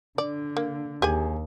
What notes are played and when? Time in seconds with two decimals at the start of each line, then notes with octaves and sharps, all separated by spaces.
0.18 D3 D5
0.57 A#3
1.02 D#2 G4 G#4 G#5